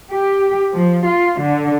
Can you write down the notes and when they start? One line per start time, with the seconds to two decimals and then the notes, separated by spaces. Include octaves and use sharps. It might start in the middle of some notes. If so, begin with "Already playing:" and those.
0.10 G4
0.74 F3
1.04 F4
1.38 D3